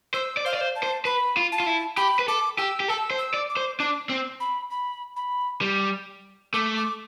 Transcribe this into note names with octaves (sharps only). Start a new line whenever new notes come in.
C5 E6
D5
C5 F5
D5
C5
A5
C5
B4 B5
F4
A5
F4
E4
G4 B5
B4
A4 D6
G4 E6
G4
A4 E6
C5
E6
D5
D6
C5
D4 D6
C4
B5
B5
B5
G3
A3 D6
D6